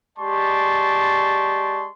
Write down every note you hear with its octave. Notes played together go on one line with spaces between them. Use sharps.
G#3 G4 D5 A5 C6 C#6